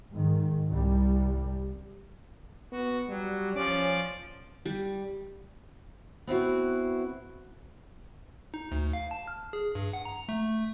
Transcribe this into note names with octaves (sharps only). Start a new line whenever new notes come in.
G#2 D#3
C2 G3
B3 F#4
F#3 G3
F3 C#4 D5 D6
G3
B3 C4 E4 F#4
D#4
D2
F5
A5
F6
G#4
G2
F#5
A#5
A3